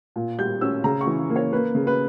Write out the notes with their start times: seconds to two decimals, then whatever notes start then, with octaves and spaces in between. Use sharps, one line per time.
0.16 A#2
0.38 G3 G6
0.61 C#4 E6
0.84 C#3 A#5
1.01 C#6
1.07 E3
1.30 A#3
1.36 C#5
1.52 A#3 B4
1.75 C#3
1.87 B4